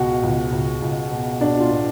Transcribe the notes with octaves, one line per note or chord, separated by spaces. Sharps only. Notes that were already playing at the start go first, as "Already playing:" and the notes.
Already playing: C#2 B2 F#4
C#2
C#2
C#2
B2
B2 D4
F4
B2